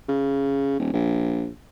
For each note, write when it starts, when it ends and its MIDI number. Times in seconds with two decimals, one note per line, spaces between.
0.08 0.79 49
0.79 0.92 27
0.93 1.48 34